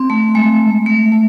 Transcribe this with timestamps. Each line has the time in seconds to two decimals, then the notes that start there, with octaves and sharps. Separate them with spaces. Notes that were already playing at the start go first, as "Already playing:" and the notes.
Already playing: C4
0.10 A3
0.35 G#3
0.86 A3
1.12 A3